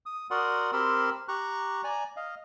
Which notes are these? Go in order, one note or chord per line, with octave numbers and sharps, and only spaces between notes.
D#6
F#4 A#4 D5 F#5 C6 D#6
C4 G4 A#4 B5 C6 E6
G4 A#5 C#6 F#6
D5 G#5 A#5
D#5 F5